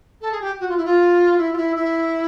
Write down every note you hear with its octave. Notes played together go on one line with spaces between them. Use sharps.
A4
G#4
G4
F#4
F4
E4
F4
E4
F4
E4
E4